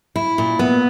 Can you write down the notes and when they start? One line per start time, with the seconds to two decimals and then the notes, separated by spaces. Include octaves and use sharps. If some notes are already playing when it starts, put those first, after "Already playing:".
0.16 E4
0.38 A#2
0.59 B3